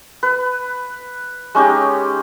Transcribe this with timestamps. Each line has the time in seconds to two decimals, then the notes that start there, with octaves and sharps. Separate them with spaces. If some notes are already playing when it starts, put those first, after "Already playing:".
0.23 B4
1.55 G#3 C#4 D#4 G4